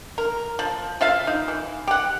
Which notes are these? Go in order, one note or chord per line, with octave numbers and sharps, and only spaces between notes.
A#4
F3
F4 E5 F5
D#4
E3
G4 F#5